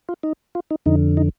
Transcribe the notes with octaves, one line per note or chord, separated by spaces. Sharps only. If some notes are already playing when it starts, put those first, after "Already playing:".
F4
D#4
F4
D#4
F2 D3 D#4
D#4